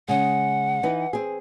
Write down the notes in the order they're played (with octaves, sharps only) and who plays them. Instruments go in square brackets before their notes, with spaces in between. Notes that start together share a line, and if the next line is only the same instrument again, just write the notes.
[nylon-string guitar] C#3 G#3 [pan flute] F#5
[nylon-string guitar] E3 D#4 B4
C4 G#4